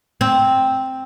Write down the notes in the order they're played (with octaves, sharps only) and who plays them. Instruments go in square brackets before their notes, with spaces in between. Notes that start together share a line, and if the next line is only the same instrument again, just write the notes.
[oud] C4